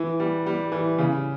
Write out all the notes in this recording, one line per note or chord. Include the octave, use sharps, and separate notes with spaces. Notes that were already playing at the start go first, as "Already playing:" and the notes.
Already playing: E3
G3
G3
E3
C#3